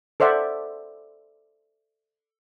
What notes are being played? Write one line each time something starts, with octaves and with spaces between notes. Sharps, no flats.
A4 C5 D5 E5 F#5